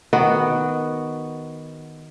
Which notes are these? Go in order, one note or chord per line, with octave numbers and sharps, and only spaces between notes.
D#3 B3 F#4